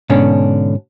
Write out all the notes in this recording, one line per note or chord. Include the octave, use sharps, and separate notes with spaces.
G#2 B2 D3 C#4 D4